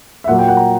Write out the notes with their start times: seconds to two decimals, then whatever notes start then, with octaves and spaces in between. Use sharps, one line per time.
0.24 E5
0.28 A#2 F#3 A#3 F#5
0.39 G5
0.48 F#5
0.57 A#5